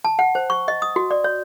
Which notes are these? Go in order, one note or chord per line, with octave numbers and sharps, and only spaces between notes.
A5
F#5
C5
C#6
D#5
D#6
F#4
D5
C#5